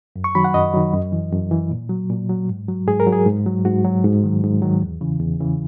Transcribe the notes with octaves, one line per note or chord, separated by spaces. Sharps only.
F#2
C#6
D#3 F#3 B5
F#5
F#2 D#5
D#3 F#3
F#2
E3
F#2
E3
A#2
F#3
A#2
F#3
G#2
F#3
G#2 G#4
A#4
F#3
G#4
G#2
F#3
G#2 F#4
F#3
G#2
D#3 F#3
G#2
D#3 F#3
E2
C#3 E3
E2
C#3 E3